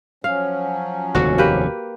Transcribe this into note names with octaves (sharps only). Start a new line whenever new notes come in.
F3 F#3 C#4 F5
F1 D#2 D3 F#4
A#3 G4 B4